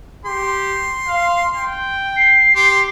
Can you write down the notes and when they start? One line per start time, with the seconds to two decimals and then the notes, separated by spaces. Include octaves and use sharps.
0.25 G4 C6
1.08 F5
1.56 G5
2.17 C7
2.56 G4 C6